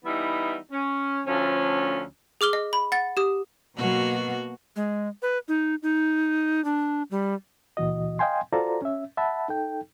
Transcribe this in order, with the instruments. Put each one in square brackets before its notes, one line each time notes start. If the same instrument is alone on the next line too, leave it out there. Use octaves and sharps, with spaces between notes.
[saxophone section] E3 G3 B3 D#4 E4 E5
C#4
D2 F3 C#4
[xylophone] G#4 D6 F6 G7
D#5
B5
F#5 A6
G4 D#6
[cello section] B2 F#3 [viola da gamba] A#3 F#4
[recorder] G#3
B4
D#4
D#4
D4
G3
[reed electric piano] C#2 A#2 E3 F#4 D#5
D#5 F5 G5 G#5 C6
F4 F#4 A4 C5 D5 A#5
C#4 E5
E5 F#5 A5 B5
D#4 A4 G5